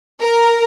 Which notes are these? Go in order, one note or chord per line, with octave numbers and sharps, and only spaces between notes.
A#4